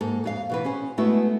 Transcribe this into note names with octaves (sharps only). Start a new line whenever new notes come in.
G#2 A#3 A4
F2 G#4 F5
B2 E3 B4
C#4 G#4 C5
G#3 A3 B3 E4 F#4